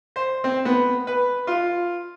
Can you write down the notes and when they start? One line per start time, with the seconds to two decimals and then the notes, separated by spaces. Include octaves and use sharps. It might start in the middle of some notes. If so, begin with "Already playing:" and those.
0.16 C5
0.44 C4
0.65 B3
1.07 B4
1.47 F4